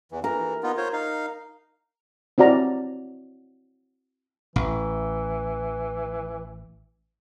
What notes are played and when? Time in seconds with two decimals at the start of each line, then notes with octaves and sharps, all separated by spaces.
0.12 E2 E3
0.24 E3 A#4
0.63 B3 D#4 F4
0.77 F4 C5 C#5
0.93 D#4 F5
2.38 C4 E4 F#4 D5 A#5
4.56 A1 E3